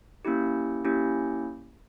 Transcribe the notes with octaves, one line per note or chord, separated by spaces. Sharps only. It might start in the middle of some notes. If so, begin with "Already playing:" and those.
A#3 C#4 E4 G4
A#3 C#4 E4 G4